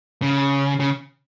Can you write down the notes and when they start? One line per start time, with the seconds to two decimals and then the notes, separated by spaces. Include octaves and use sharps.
0.22 C#3
0.80 C#3